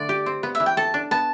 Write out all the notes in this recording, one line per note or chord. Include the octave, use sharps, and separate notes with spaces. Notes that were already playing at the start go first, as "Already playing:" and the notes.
Already playing: D3 A3 D5
G4
C4
B3
E5
E3
G5
A4 A5
D4
B3 A5